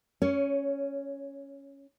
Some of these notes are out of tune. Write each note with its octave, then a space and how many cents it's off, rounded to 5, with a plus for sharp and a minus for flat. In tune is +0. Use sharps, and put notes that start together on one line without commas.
C#4 +0 C#5 +20